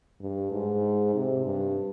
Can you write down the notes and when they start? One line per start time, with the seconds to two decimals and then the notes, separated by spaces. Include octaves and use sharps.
0.21 G2
0.52 G#2
1.14 C3
1.46 G2